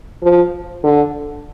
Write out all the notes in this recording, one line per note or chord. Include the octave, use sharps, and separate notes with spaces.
F3
D3